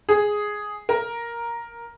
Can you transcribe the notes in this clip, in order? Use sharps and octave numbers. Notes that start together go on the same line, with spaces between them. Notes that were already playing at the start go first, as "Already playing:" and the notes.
G#4
A#4